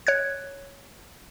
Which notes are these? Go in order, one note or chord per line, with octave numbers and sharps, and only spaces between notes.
C#5 F#6 G#6